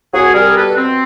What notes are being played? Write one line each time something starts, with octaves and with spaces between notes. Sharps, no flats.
C2 F#4 G#4
G3 G#4 A#4
B2 A4 B4
C4